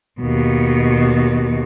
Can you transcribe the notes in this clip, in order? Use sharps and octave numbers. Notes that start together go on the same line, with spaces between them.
D#2 B2